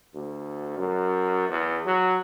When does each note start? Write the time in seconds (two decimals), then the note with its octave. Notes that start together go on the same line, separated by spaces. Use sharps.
0.14 D2
0.78 F#2
1.49 E2
1.86 F#3